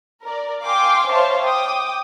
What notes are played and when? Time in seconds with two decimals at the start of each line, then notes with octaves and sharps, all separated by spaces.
0.23 A#4 D5
0.65 F5 G5 G#5 C6 D6
1.10 C5 C#5 E5 F5 A5 C6
1.43 G5 D6 D#6